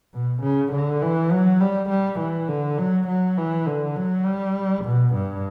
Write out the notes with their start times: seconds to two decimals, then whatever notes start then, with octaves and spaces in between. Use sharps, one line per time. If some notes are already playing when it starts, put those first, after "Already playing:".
0.13 B2
0.43 C#3
0.72 D3
1.02 E3
1.31 F#3
1.60 G3
1.89 G3
2.20 E3
2.49 D3
2.78 F#3
3.08 F#3
3.38 E3
3.67 D3
3.96 F#3
4.25 G3
4.84 B2
5.15 G2